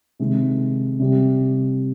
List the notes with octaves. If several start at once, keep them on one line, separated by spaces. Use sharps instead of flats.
C3 D#3 G#3
C3 G3